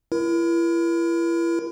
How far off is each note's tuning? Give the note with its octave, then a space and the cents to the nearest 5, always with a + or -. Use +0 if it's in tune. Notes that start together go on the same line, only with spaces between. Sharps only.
E4 +35 A#4 +30